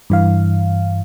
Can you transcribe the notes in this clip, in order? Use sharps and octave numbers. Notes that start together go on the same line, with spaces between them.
G2 E3 F5